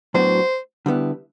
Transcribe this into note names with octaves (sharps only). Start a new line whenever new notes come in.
A2 F#3 B3 D4 F#4 C5
D3 G3 B3 E4